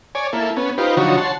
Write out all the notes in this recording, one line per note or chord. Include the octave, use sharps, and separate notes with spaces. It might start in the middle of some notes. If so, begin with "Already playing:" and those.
C#5 D5 G#5
A#3 E4 A4
B3 C#4
D#4 F4 G4 B4 C5
D3 F3 F#3 D#4 F#4 C#5
C#5 F#5 A5 C6